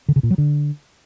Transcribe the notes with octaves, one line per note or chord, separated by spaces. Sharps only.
D3
C#3
A#2
F#3
D3